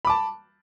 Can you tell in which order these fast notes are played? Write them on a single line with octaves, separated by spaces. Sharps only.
B5 D6 A5